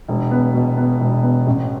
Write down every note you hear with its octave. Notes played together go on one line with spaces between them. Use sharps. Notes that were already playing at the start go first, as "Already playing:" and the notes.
E1
B3
B2
B3
E1
B3
A1